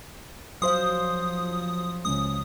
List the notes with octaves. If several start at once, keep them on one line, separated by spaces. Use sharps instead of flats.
F3 F#3 C5 F5 C6 D#6
C#2 C#3 D#6